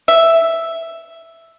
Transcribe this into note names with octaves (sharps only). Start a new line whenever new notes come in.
E5